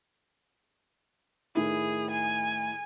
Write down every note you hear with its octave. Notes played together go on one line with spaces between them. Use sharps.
A2 D#3 E4 G#4
G#5